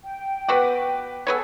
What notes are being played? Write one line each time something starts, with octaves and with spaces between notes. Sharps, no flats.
G5
B3 F#4 B4 F#5 D6
B3 G#4 A4 B4 C#5 E6 G#6